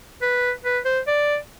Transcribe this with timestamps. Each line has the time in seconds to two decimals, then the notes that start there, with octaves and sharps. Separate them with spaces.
0.22 B4
0.64 B4
0.85 C5
1.07 D5